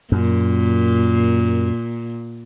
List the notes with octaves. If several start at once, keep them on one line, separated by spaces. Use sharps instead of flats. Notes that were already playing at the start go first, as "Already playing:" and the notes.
F#2 A#2